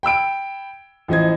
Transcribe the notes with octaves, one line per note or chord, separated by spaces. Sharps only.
G5 B5 E6 D7
A1 F3 D#5 G#6